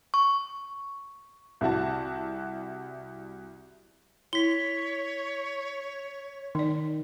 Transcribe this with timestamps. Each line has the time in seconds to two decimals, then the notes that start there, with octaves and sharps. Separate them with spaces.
0.14 C#6
1.61 C2 E4 F#4 A5
4.33 E4 C#5 B6 G7
6.55 D#3 D#4 D5